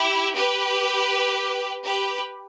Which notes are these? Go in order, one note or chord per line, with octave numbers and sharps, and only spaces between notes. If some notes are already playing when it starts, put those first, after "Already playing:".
Already playing: E4 G4
G4 B4
G4 B4